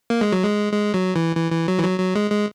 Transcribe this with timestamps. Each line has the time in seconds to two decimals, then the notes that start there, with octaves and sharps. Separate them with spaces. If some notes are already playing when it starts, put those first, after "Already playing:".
0.10 A#3
0.21 G#3
0.32 F#3
0.44 G#3
0.73 G#3
0.94 F#3
1.16 E3
1.36 E3
1.52 E3
1.68 F#3
1.79 E3
1.84 F#3
2.00 F#3
2.16 G#3
2.31 G#3